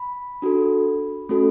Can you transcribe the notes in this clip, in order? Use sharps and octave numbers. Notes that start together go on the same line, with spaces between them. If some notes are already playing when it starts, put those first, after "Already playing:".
Already playing: B5
D4 F#4 A4
A3 C#4 F#4 A4